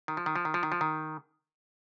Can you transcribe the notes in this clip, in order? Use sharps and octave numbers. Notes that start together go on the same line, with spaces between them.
D#3
F3
D#3
F3
D#3
F3
D#3
F3
D#3